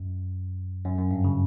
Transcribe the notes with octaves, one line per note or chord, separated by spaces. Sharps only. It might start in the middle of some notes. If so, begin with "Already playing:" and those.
Already playing: F#2
F#2
F#2
G2
C#3